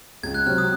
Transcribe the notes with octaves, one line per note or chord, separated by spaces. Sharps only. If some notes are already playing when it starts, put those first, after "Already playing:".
C#2 G#6
F#6
C3 F#3 C4 F#4 F6
D#6